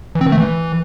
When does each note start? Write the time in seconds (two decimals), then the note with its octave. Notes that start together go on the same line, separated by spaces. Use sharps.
0.15 E3
0.21 C4
0.26 D#3
0.32 A3
0.38 E3